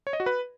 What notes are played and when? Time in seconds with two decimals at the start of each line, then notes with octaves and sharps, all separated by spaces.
0.07 C#5
0.13 D#5
0.20 F#4
0.26 B4